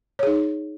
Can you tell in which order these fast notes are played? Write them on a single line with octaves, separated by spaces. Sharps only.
C#5 G#4 D#4